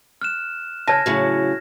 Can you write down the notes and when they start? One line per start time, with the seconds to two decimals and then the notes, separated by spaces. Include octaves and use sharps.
0.21 F6 F#6 E7
0.88 C#3 C#5 A5 F6 G#6 A#6
1.06 A2 C#3 F#3